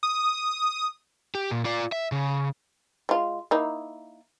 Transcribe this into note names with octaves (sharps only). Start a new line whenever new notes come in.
D#6
G4
A#2
F4 D5
E5
C#3
G#3 F4
A#3 D#4 E4